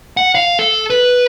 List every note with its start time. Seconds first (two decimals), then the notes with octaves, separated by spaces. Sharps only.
0.17 F#5
0.35 F5
0.59 A4
0.90 B4